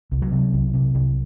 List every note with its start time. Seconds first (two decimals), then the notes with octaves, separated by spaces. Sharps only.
0.12 C2
0.22 F#3
0.32 C3
0.53 C2
0.74 C3
0.94 C2